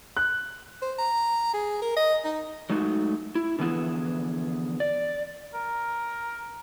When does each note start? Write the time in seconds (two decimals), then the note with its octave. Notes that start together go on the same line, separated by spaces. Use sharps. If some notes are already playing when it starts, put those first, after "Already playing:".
0.17 F#6
0.82 C5
0.99 A#5
1.54 G#4
1.82 A#4
1.97 D#5
2.24 D#4
2.70 F#3 G#3 A3 D#4 F4 F#4
3.35 E4
3.59 D3 E3 F3 B3 E4 G#4
4.80 D5
5.54 A#4